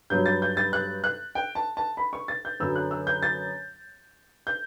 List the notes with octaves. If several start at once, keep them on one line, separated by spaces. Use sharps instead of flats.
G2 F#3 B3 G6
A6
G6
A6
F#6
F#6
G5
A5
A5
B5
C#6
A6
G6
F#2 D3 F#3 B3 E6
F#6
E6
G6
A6
G6